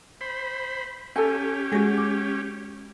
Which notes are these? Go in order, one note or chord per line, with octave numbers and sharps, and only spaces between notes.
C5 B5
C#4 G4 A4 G#5
G#3 F#4 G#4 A#6
D6